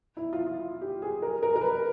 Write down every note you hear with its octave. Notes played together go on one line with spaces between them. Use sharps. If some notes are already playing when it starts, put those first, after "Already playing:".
E4
F4
F4
G4
G#4
A#4
A#4
A#4
B4